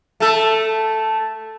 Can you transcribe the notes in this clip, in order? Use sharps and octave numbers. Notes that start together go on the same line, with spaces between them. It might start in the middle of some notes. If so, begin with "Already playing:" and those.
A3 A4